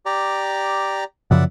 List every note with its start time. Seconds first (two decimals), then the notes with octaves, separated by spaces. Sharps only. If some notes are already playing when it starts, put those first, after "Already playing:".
0.06 G4 D5 A#5
1.31 F#2 C#3 F3 D5 E5 F#5